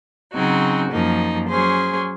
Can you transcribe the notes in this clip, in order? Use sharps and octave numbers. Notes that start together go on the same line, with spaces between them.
C#3 F#3 C4 D#4 F#4
F#2 F3 A#3 D#4
F#3 C#4 G#4 C5